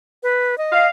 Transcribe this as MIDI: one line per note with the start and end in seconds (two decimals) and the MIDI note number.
0.23 0.58 71
0.58 0.87 75
0.72 0.88 77